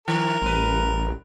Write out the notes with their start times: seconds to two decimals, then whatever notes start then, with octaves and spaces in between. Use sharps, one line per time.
0.08 D#3 A#4
0.42 A1 G3 B4